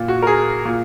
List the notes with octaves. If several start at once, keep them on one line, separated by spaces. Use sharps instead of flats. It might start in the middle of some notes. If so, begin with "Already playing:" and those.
Already playing: A#2
F#4
A#4
G#4
A#2